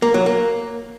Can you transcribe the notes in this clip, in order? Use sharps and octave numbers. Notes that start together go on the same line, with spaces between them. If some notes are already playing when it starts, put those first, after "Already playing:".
A#3
F#3
A#3